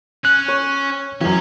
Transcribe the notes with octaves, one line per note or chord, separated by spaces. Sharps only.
C#4 F#6
C#5
F#2 E3 C#4